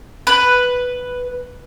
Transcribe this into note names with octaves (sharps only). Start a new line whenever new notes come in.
B4